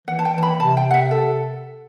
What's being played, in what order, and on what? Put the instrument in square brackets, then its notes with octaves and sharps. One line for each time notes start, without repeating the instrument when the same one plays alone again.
[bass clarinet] E3 [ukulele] F#5
[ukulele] A5
G5
[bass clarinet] E3 [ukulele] A5
[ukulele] B5
[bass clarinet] C3 [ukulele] A5
[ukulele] G5
F#5
E5
A4